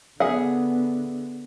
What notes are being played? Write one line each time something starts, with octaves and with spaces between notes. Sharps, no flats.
D3 B3 G#4 E5 F#5